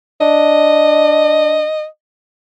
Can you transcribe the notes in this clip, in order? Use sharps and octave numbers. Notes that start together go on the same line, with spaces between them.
D4 D#5